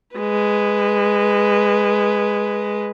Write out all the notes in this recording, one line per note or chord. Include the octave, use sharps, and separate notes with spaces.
G#3 B4